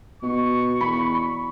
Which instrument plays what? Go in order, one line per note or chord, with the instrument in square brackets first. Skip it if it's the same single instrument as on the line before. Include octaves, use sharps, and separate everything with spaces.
[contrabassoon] B2 [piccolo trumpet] C#6
[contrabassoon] E2 [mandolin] B5